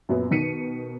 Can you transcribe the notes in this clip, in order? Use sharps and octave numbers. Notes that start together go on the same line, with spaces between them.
F#2 A#2 F#3 B3
B2 D#3 B6 C#7 D#7